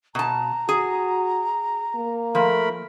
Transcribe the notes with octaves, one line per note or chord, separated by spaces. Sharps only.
B2 A5 A#5
F#4 G#4
A#3
F3 A3 A#4 B5